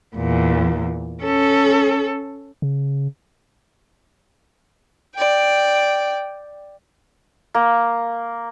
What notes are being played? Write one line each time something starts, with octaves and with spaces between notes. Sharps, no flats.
E2 A#2
C#4 A4
C#3
D5 G5
A#3